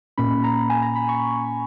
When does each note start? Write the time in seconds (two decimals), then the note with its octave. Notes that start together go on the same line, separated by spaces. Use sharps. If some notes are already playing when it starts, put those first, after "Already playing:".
0.18 A#2 A#3 C#4 B5
0.44 A#5
0.70 G#5
0.83 A#5
0.96 B5
1.09 C#6